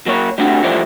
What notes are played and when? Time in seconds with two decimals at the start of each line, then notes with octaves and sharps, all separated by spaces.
0.06 F#3 A#3 C#5
0.38 G3 A3 C4 D4 F#4
0.63 E3 F3 G3 A3 C5 D5